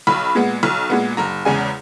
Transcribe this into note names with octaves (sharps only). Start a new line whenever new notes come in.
B1 B5
A#2 G#3 B3
B1
A#2 G#3 B3
F#1 A#5
E2 C#3 G#3 G#5